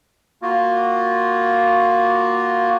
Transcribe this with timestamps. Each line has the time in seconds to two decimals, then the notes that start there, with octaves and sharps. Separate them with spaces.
0.42 A#3 F4 F#4